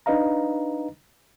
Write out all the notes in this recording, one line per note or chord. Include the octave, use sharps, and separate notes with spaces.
D4 D#4 B4 D#5 F5 A#5